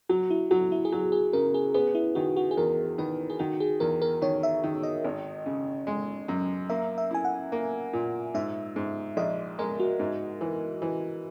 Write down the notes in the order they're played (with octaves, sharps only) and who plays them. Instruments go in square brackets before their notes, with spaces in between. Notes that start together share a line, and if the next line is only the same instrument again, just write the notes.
[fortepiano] F#3 [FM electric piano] F#4
[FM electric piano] E4
[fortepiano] F#3 [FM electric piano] F#4
[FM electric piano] E4
G#4
[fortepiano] F#3 [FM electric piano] F#4
[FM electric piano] G#4
[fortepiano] C#3 [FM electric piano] A#4
[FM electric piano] G#4
[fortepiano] B3 [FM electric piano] G#4
[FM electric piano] E4
[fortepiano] D#3 [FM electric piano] F#4
[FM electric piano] F#4
G#4
[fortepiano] E2 [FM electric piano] A#4
[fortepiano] D#3 [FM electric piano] B4
[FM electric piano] G#4
[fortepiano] D#3 [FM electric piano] F#4
[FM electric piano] G#4
[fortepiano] E2 [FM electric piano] A#4
[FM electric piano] A#4
[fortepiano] D#3 [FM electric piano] C#5
[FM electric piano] E5
[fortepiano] D#3
[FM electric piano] D#5
[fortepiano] G#1
C#3
G#3
F#2
[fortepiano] A#3 [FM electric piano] E5
[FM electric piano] E5
[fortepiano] E4 [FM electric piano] G#5
[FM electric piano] F#5
[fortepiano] A#3
A#2
[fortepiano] G#2 [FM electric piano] E5
[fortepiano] G#2
[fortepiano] A#1 [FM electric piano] D#5
[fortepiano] G#3 [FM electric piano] A#4
[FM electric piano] F#4
[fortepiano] G#2
E3
E3